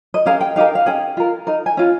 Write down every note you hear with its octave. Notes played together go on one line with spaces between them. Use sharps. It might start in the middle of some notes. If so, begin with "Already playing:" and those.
D#5
C#4 G4 A#4 F5
G5
D#4 G4 A#4 F5
F5
C#4 G#4 G5
F4 A#4
D#4 A#4
G#5
C#4 F4